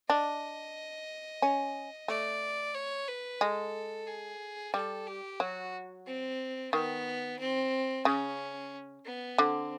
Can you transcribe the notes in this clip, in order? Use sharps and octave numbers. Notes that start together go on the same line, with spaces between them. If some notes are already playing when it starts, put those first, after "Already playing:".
D4 D#5
C#4
A3 D5
C#5
B4
G#3 A4
G#4
G3 A4
G4
F#3 F#4
C4
D#3 B3
C4
C#3 C#4
B3
D3 C4